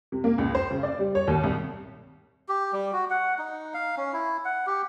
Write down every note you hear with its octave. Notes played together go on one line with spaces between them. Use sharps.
C3
A#3
C#2
C5
C#3
D5
G3
C#5
D#2
C2
G4
G3
F#4
F#5
D#4
F5
C#4
E4
F#5
G4